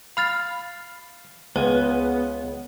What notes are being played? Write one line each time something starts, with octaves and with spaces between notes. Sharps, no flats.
F5 B5 F6 A6
C#2 B3 B4 G#5